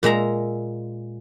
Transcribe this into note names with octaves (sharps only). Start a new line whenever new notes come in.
A#2 G#3 E5 A#5